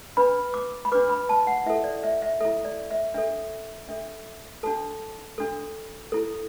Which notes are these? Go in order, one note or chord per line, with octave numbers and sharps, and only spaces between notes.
D4 B4 B5
D6
B5
D4 B4 D6
B5
A5
F#5
E4 A4 E5
D5
E5
E5
E4 A4 E5
D5
E5
D4 A4 E5
D4 A4 E5
D4 F#4 A4 A5
D4 F#4 A4
E4 A4